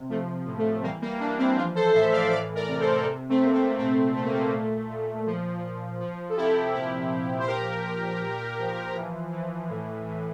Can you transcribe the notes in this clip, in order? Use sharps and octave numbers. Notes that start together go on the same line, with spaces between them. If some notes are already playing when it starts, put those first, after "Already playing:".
Already playing: C3
F3 A3
A2
A3
E3 G3 A#3
G3 A#3
E3 A#3 D4
C4 E4
F3 D4 F4
A4 C5
A2 C5 E5
D5 F5
E3 D5 F5
A#4 D5
C3
A4 C5
C3
A3 C4
C3 A#3
A3 C4
A#2 A3 C4
A#2 A3
A#3
A3
A#2
A#2
F3
F3
F3
A4
C3 E4 G4
A#2 E4 G4
F3
C5
F3 G4 A#4
F3
A#2
F3
E3
E3
A2
A2